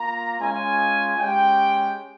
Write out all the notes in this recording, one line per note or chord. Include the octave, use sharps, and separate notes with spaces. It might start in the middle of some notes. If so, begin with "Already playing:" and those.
Already playing: A#3 F4 A#5
G#3 C#4 F4 G#5
G#3 C#4 G4 G5